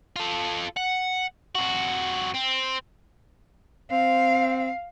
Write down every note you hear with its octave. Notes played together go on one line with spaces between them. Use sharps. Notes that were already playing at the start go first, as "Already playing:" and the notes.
F4 A4
F#5
F2 F#4
C4
C4 F5